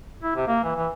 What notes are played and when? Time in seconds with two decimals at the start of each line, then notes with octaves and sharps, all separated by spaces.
0.23 E4
0.35 C3
0.47 A#3
0.63 E3
0.76 E3